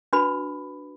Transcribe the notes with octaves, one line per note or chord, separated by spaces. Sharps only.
D4 F#4 B4 B5